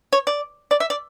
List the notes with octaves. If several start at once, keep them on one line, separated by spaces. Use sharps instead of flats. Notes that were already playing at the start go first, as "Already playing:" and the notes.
C#5
D5
D5
E5
D5